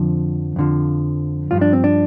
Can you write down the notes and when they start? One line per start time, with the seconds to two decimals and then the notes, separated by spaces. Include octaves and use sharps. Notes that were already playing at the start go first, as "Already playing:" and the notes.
Already playing: F2 D3 F3
0.56 F2 D3 F3
1.51 G2 F3 F4
1.61 D4
1.73 C4
1.84 D4